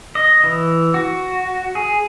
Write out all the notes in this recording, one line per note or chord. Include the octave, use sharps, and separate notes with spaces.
D#5
E3
F#4
G#4